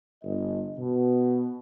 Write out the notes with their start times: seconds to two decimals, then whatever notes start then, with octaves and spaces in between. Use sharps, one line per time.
0.24 G1 D#5
0.77 B2